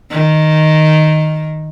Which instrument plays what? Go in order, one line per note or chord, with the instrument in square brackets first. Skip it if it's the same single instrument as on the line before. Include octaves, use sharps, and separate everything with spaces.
[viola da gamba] D#3